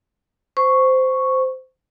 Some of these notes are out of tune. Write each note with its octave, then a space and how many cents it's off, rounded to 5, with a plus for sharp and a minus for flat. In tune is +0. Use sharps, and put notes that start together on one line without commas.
C5 -15 C#6 +0